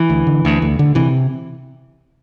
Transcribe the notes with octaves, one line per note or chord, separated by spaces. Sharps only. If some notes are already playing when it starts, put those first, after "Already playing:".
Already playing: E3
D2
D3
D2
D2
D3
C3 E3